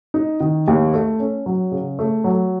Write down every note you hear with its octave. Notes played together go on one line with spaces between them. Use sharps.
D#4
D#3
D#2
A3
C#4
F#3
C#3
A3
F#3